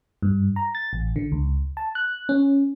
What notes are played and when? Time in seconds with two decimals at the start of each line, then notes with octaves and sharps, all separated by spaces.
0.22 G2
0.56 A#5
0.75 A6
0.93 A1
1.16 D3
1.32 C#2
1.77 A5
1.95 F#6
2.29 C#4